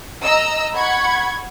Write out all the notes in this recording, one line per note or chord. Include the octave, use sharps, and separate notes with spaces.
D#5 A#5 E6
F#5 B5 C#6 G#6